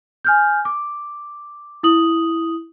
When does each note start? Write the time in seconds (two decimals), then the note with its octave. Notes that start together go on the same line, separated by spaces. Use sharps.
0.25 G#5 F6 G6
0.65 D6
1.83 E4 D#6 F#7